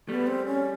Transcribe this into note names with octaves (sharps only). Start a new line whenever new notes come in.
G3 A3 B3
C4
C#4